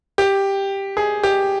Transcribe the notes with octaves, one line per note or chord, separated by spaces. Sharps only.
G4
G#4
G4